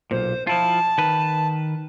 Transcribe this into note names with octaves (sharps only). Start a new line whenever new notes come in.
B1 A#2 C5
F3 E4 F4 A5
D#3 B4